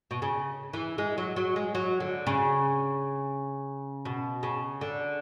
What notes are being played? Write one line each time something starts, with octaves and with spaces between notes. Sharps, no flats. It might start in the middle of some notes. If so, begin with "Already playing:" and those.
B2
C#3
E3
G#3
F#3
F#3
G#3
F#3
D3
C#3
B2
C#3
D3